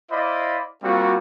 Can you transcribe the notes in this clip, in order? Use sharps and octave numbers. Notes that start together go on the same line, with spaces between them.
E4 C5 D5 D#5 F5 B5
G3 A#3 C4 F4 F#4